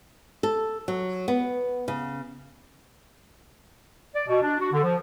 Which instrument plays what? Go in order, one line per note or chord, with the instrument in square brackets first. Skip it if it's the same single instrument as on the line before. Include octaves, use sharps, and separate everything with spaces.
[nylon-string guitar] A4
F#3
B3
C#3
[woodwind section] D5
B2
D4
F#4
D3
F3